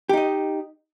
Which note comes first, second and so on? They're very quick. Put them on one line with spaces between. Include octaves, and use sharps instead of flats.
G4 D#4 D#5